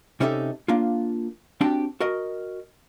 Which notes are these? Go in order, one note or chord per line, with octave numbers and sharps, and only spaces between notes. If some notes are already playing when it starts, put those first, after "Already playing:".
C3 C#4 D#4 G4 A4 E5
A#3 D4 F4
C4 D4 F#4 G4 G5 A5
F#4 A#4 D#5